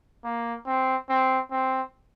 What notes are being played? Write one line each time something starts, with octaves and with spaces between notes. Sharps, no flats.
A#3
C4
C4
C4